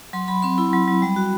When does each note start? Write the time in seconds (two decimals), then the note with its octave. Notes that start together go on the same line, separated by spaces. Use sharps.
0.13 F#3 C6
0.28 F#3 B5
0.42 C4 C6
0.58 E4 B5
0.73 F#3
0.88 F#3
1.02 G3
1.16 F#4